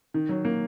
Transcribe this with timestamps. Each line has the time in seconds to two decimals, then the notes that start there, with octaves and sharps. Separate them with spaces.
0.14 D#3
0.29 F#3
0.45 A#3